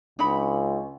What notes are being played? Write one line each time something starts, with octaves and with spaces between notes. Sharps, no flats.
C#2 D4 D#4 B5